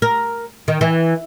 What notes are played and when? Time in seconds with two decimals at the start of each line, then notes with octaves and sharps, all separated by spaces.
0.02 A#4
0.68 D#3
0.81 E3